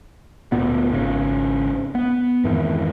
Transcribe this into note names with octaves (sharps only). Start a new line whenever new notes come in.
D2 A#2 B3
G#1 C#3
B3
F2 G#2 D#3 E3